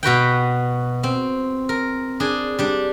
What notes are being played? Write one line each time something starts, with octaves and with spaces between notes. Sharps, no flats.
B2 F#4 B4 G5
C4
A#4
D4 G#4
G3 D4